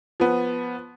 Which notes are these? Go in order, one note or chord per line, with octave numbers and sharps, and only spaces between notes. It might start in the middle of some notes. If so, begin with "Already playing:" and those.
F3 B3